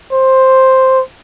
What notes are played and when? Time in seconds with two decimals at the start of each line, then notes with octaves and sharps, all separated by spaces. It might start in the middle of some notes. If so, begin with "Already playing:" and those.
0.13 C5